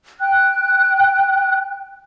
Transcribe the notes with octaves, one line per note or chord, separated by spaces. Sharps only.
G5 F#6